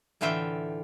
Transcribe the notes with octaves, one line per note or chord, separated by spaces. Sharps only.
A2 D3 E3 F4 E5 G5